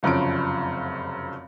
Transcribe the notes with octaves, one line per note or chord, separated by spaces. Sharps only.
F1 F#2 C#3 F3 D7